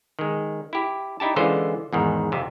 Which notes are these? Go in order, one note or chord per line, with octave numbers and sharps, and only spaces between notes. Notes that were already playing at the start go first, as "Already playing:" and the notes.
D#3 G#3
E4 G4
D#4 E4 G4 A5
D3 E3 G#3 C#4 F4 C5
E2 G#2 D#3
F2 C3